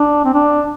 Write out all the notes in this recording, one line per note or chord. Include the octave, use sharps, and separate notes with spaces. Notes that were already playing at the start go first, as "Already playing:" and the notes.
Already playing: D4
C4
D4